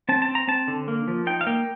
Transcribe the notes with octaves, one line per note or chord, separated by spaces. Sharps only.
C4 A5
A5
C4
A#5
C4 A5
D3
A#3
F3
D#4 G5
F5
A#3 G5